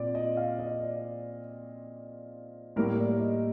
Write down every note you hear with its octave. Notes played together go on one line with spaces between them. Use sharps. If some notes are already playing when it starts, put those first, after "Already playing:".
Already playing: A#2 C4 D5
D#5
F5
D#5
D5
A2 G3 A#3 A#4
D5
D#5